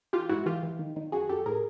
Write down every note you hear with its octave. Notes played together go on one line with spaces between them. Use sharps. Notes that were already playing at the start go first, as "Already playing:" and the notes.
E3 F4 G4
G#2 E4 F#4
E3 F4 G4
E3
D#3
D#3
F#2 F#4 G#4
F#2 G4 A4
A2 G#4 A#4